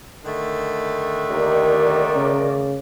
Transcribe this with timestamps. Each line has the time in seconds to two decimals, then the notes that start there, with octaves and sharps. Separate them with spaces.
0.24 D3 D#3 A3
1.30 D#2 A#4 D5
2.16 C#3